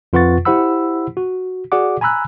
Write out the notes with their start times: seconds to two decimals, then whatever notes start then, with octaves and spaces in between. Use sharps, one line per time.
0.13 F2 F4 B4 F#5 C#6 A6
0.45 E4 G4 C5 F#5 B5 E6
1.17 F#4
1.72 F#4 G#4 D5 F#5 D6
2.01 G#5 A#5 B5 E6 F#6